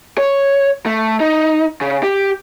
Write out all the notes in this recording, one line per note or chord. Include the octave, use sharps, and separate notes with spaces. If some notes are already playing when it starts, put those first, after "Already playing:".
C#5
A3
D#4
C#3
G4